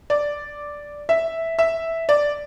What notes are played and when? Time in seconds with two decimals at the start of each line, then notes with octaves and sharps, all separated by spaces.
0.10 D5
1.09 E5
1.59 E5
2.09 D5